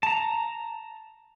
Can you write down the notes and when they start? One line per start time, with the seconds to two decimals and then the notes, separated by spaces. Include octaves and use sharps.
0.03 A5 A#5